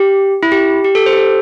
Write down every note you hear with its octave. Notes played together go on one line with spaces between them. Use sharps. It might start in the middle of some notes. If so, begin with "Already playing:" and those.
Already playing: G4
E4
G4
G4
A4
C5
G4
A4